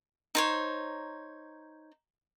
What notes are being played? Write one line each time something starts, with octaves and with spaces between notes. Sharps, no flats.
D#4 C5 C#5